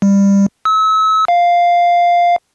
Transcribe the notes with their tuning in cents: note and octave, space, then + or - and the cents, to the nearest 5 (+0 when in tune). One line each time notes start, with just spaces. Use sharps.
G3 +20
E6 -35
F5 +0